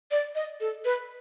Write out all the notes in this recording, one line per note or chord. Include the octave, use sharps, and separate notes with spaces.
D5
D#5
A4
B4